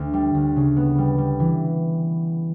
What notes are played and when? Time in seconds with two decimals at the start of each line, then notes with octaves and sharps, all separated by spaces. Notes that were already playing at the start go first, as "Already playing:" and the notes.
Already playing: D2
0.13 G3
0.34 D2
0.56 C#3
0.77 B3
0.98 G3
1.18 G3
1.40 E3